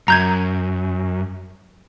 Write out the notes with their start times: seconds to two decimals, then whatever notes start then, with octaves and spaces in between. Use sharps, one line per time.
0.08 F#2 A#5 G6 G#6